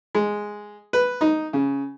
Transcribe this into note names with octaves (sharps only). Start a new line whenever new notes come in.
G#3
B4
D#4
C#3